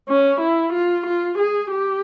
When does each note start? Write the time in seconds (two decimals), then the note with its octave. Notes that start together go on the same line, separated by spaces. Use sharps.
0.09 C#4
0.40 E4
0.73 F4
1.06 F4
1.38 G#4
1.71 G4